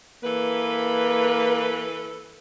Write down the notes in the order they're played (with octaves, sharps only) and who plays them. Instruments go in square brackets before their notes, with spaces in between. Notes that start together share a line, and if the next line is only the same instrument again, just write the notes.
[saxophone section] E3 A4 B4 [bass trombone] A#3